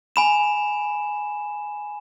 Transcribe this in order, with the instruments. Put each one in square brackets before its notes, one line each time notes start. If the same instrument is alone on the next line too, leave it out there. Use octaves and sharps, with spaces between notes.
[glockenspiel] G#5 B5 E7